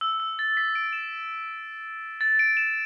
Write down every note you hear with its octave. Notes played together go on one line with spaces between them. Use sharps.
E6
E6
A6
B6
D7
E7
A6
D7
E7